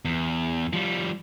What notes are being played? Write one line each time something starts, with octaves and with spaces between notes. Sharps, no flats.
E2
F3 G3